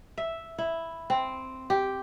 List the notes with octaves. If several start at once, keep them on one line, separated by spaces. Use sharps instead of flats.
E5
E4
C4
G4